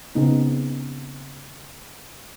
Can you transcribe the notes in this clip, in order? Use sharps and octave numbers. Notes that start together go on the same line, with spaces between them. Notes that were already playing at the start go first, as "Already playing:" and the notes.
C#3 B3 C4 D#4